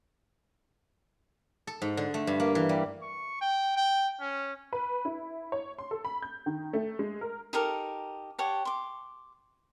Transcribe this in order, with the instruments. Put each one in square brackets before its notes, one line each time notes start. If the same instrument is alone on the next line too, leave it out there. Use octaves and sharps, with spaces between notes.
[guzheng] A4
G#2
D3
A3
G2
A#3
E3
G3
[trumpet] C#6
G5
G5
C#4
[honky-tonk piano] B4
E4
C#5
C6
A4
B5
G6
D#3
A3
G#3
A#4
[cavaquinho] D#4 G4 A4 A#4
G4 C#5 F#5 A5
C6 D6